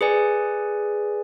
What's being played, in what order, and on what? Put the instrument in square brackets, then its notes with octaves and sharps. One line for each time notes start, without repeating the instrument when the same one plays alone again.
[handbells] G#4 B4 D5 G#5